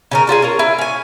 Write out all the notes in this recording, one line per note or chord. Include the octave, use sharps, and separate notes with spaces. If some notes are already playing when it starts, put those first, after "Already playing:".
C#3 C#4 A#4
D4 F4 F#4 G#4
C#4 A#4
E4
C#4 G#5